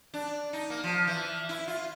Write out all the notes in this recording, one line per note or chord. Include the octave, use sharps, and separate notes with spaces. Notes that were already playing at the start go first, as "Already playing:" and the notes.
D4
D#4
A#3
F3
E3
E4
F4